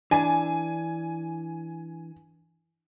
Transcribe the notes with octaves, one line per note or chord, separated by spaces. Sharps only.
E3 D4 G#5